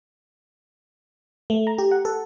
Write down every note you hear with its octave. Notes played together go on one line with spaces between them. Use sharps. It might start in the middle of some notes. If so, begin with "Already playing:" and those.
A3
A#5
G4
F#5
A4